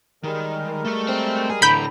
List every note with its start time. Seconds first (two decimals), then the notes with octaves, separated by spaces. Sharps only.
0.24 D#3 G3 G#3 A#4
0.85 A3 A4
1.09 C4
1.50 G#4
1.62 A2 D3 E3 F#3 A#5 B5 G6